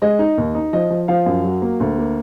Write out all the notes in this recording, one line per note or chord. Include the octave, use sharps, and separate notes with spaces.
G#3 D#5
D#4
D#2
D#4
F3 D#5
F3
F3 F5
F#2
F#3
A#3
D2
A#3